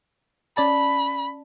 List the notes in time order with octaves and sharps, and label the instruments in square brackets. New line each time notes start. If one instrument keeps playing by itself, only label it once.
[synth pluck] C#4 D5 A5 [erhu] B5